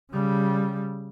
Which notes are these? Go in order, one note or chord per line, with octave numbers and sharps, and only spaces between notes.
C#3 G3